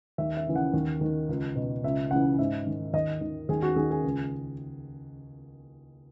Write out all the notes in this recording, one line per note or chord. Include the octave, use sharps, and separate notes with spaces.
D#2 E5
E5
C#3 E3
F#5
D#2
D#3
C#2
B2
C#2 E5
C#3 E3 F#5
G#2 E5
D#3
D#2 D#5
D#3
D#2 G#4
F#4
D#3 G#4
G#4
C#2